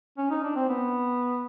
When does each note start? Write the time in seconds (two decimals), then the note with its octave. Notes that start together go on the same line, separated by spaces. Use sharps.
0.18 C#4
0.30 D#4
0.43 D4
0.56 C4
0.69 B3